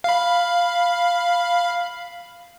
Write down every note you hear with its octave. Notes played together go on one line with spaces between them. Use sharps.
F5 B5